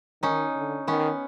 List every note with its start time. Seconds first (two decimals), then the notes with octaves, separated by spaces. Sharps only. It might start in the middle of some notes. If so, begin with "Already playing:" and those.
0.22 D#3 C#4 D#4
0.55 D3
0.87 D#3 B3 C#4